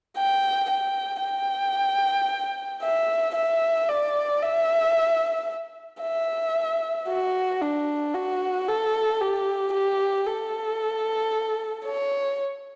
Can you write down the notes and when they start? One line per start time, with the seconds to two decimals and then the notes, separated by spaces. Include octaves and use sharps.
0.17 G5
0.70 G5
1.23 G5
2.83 E5
3.36 E5
3.89 D5
4.42 E5
6.01 E5
7.08 F#4
7.61 D4
8.14 F#4
8.68 A4
9.21 G4
9.73 G4
10.27 A4
11.86 C#5